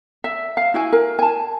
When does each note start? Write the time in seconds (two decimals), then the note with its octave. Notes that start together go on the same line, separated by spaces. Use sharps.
0.24 E5
0.57 F5
0.74 E4 F#4 G#5
0.92 A#4
1.19 G#5 A5